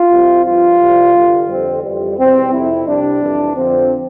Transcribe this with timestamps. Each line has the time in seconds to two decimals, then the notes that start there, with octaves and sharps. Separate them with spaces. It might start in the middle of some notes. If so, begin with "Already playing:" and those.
Already playing: F4
0.10 C2 C3 G3
0.45 G2 F3 F4
0.80 C2 C3 G3
1.14 G2 D3 G3
1.48 F2 D3 G3 C4
1.83 F2 E3 G3
2.18 E2 B2 G3 C4
2.53 F2 C3 G3 E4
2.87 C2 C3 G3 D4
3.21 F2 E3 G3
3.56 F2 D3 F3 C4